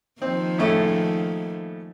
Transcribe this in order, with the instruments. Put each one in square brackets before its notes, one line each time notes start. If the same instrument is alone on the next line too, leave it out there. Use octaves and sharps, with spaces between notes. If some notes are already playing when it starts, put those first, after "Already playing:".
[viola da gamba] D#3 F3 A#3 [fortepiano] C4
[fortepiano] A2 C#3 A3